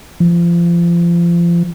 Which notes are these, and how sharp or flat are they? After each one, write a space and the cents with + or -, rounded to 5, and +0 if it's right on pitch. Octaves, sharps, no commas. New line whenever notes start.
F3 -30